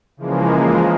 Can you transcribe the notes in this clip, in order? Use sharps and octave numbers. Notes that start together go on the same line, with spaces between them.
C#3 E3 F3 G#3 A#3